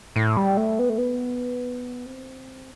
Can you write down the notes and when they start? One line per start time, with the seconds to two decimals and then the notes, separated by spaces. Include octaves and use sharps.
0.16 A2
0.37 G3
0.57 A3
0.79 B3
0.89 A3
0.98 B3
2.06 C4